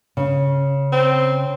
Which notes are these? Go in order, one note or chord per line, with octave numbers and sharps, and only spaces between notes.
C#3
C4